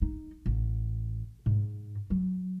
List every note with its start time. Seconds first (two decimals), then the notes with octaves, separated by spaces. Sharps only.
0.02 D#4
0.46 A1
1.46 G#2
2.10 F#3